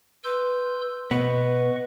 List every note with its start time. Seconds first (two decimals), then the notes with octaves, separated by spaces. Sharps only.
0.24 B4 C6 E6 G6
1.11 B2 B3 B4 D#5 F#5 C#6